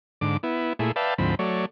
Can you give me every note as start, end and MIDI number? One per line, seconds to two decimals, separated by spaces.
0.21 0.37 44
0.21 0.37 50
0.21 0.37 86
0.43 0.73 59
0.43 0.73 64
0.79 0.92 46
0.79 0.92 57
0.79 0.92 64
0.79 0.92 68
0.96 1.14 71
0.96 1.14 74
0.96 1.14 76
0.96 1.14 77
0.96 1.14 79
0.96 1.14 81
1.18 1.35 38
1.18 1.35 44
1.18 1.35 53
1.18 1.35 60
1.18 1.35 83
1.39 1.66 54
1.39 1.66 57
1.39 1.66 73
1.39 1.66 74